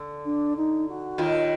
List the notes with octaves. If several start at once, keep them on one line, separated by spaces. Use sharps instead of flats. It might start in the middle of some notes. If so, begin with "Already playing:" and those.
Already playing: D3
D4
D#4
F#4
D#2 D#3 F4